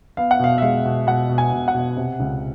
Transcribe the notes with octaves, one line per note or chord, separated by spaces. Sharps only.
B3 F5
F#5
B2 F5
E5
G#3 F5
B2
B2 F#5
B2
G#5
B2
F#5
B2
C3
C#2